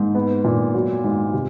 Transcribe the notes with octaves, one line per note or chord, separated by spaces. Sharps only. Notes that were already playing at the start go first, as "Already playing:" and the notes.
Already playing: G#2 A#3
B3
A#2
F#3
G#2
C3